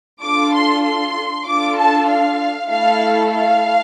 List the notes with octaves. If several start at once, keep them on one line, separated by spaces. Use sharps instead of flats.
D4 F4 A4 D6
C6
C6
D4 F4 A4 D6
A5
F5
A3 E4 A4 F5
F5